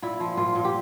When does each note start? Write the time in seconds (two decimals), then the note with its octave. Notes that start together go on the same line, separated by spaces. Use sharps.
0.02 A#2 E4
0.20 F3
0.37 A#2 F4
0.55 A#2
0.65 G4